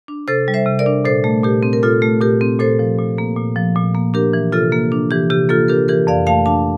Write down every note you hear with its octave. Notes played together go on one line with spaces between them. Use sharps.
D4
C3 A4 C5
G3
C5 E5
C3
A#4 D5
D4
A#2 A4 C5
A3
A#2 G4 A#4
C4
A#4
A#2 F4 A4
A3
A#2 G4 A#4
C4
A#2 A4 C5
F3
A#2
A#3
A#2
F3
A#2
A#3
D4 G4 A#4
E3
C3 F4 A4
A#3
D4
E3 G4
C3 G4
A#3 F4 A4
D4 G4 A#4
E3 G4 A#4
F2 D5 F5
A3 F5 A5
D4 F5 A5